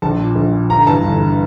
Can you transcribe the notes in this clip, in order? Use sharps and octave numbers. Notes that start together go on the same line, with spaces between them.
A#1 A5
A#2
A#1
A#2
G1 A#5
G2 E3 A5
G1
E3